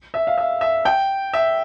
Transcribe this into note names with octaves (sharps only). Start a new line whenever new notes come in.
E5
F5
E5
E5
G5
E5